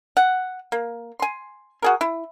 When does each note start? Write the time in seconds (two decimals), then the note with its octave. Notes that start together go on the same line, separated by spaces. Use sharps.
0.17 F#5
0.72 A#3
1.20 G#5 C6
1.82 F#4 G#4 A#4
2.01 E4